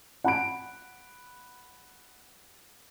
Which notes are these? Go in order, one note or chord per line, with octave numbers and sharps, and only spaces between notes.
F#5 B5 D7